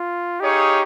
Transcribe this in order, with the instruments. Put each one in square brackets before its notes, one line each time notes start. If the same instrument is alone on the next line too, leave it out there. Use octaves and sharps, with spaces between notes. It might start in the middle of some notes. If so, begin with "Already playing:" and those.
Already playing: [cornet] F4
[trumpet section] D#4 G#4 C#5 F5 [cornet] G4